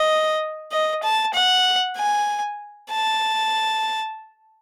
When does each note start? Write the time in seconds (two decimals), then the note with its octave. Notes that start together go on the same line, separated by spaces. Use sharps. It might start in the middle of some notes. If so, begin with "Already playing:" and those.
Already playing: D#5
0.72 D#5
1.03 A5
1.34 F#5
1.97 G#5
2.91 A5